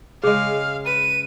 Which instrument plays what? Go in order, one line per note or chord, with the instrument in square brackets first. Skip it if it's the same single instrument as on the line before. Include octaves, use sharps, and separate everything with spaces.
[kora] C#3 G#3 [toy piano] G#4 [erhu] F5
[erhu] B4 [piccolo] D#7